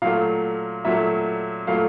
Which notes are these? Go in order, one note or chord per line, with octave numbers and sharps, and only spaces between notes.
A#2 F#3 A3 F5
A#2 F#3 A3 E5
A#2 F#3 A3 F5